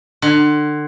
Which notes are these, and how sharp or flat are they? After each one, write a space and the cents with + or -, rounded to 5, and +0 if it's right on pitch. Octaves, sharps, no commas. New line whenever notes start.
D3 +30